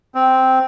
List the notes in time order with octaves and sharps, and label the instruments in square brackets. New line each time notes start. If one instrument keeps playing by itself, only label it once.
[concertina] C4